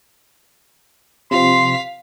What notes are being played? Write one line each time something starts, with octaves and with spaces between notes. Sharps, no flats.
C3 F3 C4 F5 C6 B6